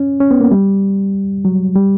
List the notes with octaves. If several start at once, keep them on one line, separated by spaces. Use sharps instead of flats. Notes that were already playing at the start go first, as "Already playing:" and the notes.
Already playing: C#4
C#4
B3
A#3
G3
F#3
G3